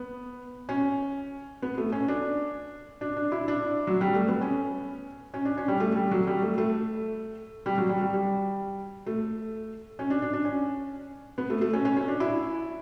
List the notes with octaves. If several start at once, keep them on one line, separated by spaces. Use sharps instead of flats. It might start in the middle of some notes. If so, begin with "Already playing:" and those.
Already playing: B3
C#4
B3
A3
C#4
D4
D4
D4
E4
D4
F#3
G3
A3
B3
C#4
C#4
D4
C#4
G3
A3
G3
F#3
G3
A3
A3
G3
F#3
G3
G3
G3
A3
C#4
D4
D4
D4
C#4
B3
A3
A3
C#4
C#4
C#4
D4
E4